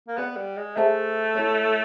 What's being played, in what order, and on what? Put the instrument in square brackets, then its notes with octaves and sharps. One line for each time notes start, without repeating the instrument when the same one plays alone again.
[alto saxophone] A#3
[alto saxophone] B3 [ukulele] B4 D5 F#5
[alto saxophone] G3
G#3
[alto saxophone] A3 [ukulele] G#4 C5 E5 A5
[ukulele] E4 A4 C#5